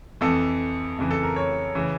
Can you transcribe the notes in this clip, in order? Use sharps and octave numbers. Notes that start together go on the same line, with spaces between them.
F2 E3 A4
F2 C#3 E3
A4
A#4
C#5
C#3 E3